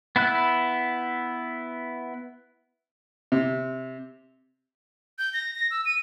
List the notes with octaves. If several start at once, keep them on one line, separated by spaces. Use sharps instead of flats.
B3 E4 B5 F#6
C3
G6
A#6
A#6
E6
D#7